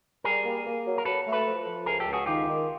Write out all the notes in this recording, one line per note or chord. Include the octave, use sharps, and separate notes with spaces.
G3 G#4 A#4
A#3
A#3
F#3
A#4
F#3 A4 B4
A3
A4 B4
F3
F3
C#2 G#4 A#4
G4 A4
C#2
F#4 G#4
D#3 F4 G4
D#3